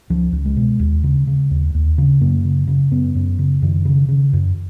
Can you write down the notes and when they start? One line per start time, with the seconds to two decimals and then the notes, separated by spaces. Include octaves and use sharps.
0.10 C#2 F3
0.32 C#2
0.45 G#3
0.57 B2
0.79 D#2
1.03 C#3
1.27 C#3
1.51 D#2
1.74 D#2
1.98 C#3
2.21 F#2 A#3
2.45 C#3
2.67 C#3
2.91 F#2 B3
3.15 F#2
3.39 C#3
3.62 F#2 D#3
3.85 C#3
4.08 C#3
4.33 F#2